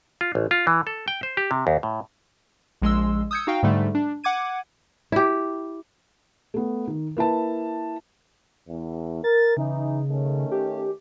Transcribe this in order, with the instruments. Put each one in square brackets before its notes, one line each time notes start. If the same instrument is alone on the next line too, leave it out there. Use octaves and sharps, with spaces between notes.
[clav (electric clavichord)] F4
A1
F4
E3
A4
G5
C5
G4
C3
D#2
A2
[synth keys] A#1 G#3 C6 E6
D#6 E6 G6 G#6 C#7
D#4 F#4 F5 G5
G#2 D3 G3 A3
D4
F#5 D6 G#6 D#7
[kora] E4 G4
[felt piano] A3 B3
D#3
A#3 E4 B4 A5
[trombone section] E2
[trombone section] A#4 [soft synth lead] A6
[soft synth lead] C#3 [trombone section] E3 D#4
[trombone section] D#3 A3 C#4
[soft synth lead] G4